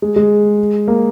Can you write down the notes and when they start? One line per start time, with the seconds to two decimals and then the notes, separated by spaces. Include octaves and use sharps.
0.02 G#3
0.16 G#3
0.88 A#3